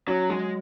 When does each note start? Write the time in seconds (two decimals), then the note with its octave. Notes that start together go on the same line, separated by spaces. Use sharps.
0.07 F#3 C#4
0.30 F#3 G#3